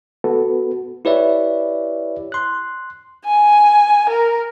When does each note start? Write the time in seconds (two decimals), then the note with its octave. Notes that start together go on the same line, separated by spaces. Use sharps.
0.24 B3 F#4 A4 B4
1.05 E4 G4 B4 C#5 D5 E5
2.32 C6 F#6
3.26 G#5
4.09 A#4